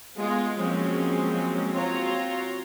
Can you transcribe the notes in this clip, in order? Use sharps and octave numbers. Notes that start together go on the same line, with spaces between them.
G#3 B3 F4
F3 F#3 G#3 A#3 C4 C#4
C4 F4 F#4 C#5 A#5